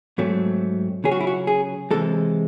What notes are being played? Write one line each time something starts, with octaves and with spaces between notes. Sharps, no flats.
G#2 F#3 A3 C4
C#3 F#3 C#4 G#4
F#4
E4
F#4
G#4
C3 E3 G#3 A4